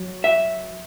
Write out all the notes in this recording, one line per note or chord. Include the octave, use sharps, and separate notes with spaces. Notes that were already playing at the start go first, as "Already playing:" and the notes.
Already playing: F#3
E5